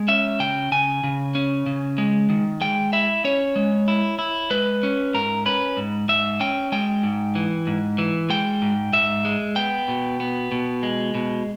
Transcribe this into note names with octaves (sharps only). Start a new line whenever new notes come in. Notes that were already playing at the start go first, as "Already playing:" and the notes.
Already playing: G#3
C#4 E5
C#3 G5
C#3 G#5
C#3
C#4
C#3
G#3
D#3
G#3 G5
E4 E5
C#4 C#5
G#3
E4
E4
G#3 B4
C#4
G#2 A#4
C#4 B4
G#2
G#2 E5
C#4 G5
G#3 G5
G#2
E3
G#2
E3
G#3 G5
G#2
G#2 E5
G#3
B3 G5
B2
B3
B2
G#3
B2